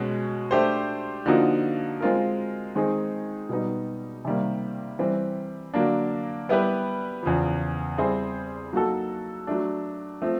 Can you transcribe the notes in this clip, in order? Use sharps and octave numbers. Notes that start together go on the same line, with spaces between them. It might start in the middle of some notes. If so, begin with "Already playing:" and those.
Already playing: B2 G#3 C#4 F#4
A3 D4 G4 C5
D3 F3 A#3 D#4 F#4
G#3 C4 F4 A#4
D#3 G#3 C4 D#4 G#4
B2 G3 B3 D#4
C3 D#3 G3 A#3
E3 G3 C4
D3 F#3 A#3 D4
G3 B3 E4 G4 B4
E2 C#3 F3
G3 C4 E4 G#4 C5
F#3 A#3 D#4 F#4 A4
F#3 A3 D4
F3 A3 C4